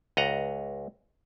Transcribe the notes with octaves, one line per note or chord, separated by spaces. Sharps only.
C#2 D#5 F#5 A#5